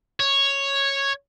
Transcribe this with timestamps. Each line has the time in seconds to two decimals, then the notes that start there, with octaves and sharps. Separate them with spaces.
0.20 C#5